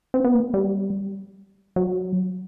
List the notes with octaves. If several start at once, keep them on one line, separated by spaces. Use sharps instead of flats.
C4
B3
A#3
G3
F#3